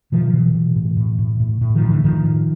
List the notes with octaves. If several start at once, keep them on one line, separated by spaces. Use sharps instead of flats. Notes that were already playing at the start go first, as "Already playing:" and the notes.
B2 D#3 F3
B2 E3 F#3
B2
A2
A2
A2
A2
A2
D#3 F3
A2
D3 E3
A2 D#3 F3
A2